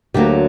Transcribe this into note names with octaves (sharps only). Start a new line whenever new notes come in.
D2 D3 F#3 A#3 G4